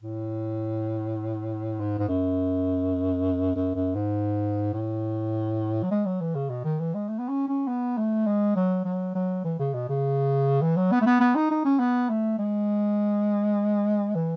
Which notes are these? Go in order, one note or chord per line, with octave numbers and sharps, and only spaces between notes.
A2
G#2
G#2
F#2
F#2
F#2
G#2
A2
F#3
G#3
F#3
E3
C#3
B2
D#3
E3
G#3
A3
B3
C#4
C#4
B3
A3
G#3
F#3
F#3
F#3
E3
C#3
B2
C#3
E3
F#3
B3
A3
B3
B3
D#4
D#4
C#4
B3
A3
G#3
E3